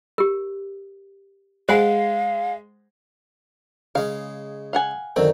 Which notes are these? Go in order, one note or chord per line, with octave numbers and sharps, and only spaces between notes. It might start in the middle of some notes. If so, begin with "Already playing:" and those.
G4 A#4
G#3 C5 F5 F#5 G#5
C#3 G#3 F5
F5 F#5 G#5
F#2 D3 D#3 C4